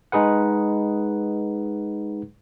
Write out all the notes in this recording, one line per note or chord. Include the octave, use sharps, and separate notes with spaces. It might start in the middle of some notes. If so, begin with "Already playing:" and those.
G#3 D#4 G#4 B4 F#5